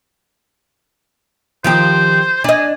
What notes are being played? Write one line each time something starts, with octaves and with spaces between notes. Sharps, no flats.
D#3 F3 G4 C5
D4 D#5 G#5